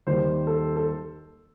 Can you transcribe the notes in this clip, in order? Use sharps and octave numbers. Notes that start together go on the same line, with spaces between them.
D#2 D#3 G3 C5
A4
A4